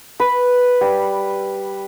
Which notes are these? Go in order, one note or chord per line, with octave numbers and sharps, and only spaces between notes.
B4
G3